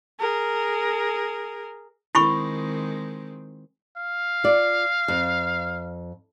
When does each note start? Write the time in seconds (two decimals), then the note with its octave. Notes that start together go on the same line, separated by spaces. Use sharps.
0.19 G#4 A#4
2.15 D#3 G#3 C4 E4 B5 C#6
3.97 F5
4.44 F4 D5
5.08 F2